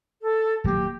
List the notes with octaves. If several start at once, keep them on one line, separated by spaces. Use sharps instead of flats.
A4
D#1 F#3 A#3 G4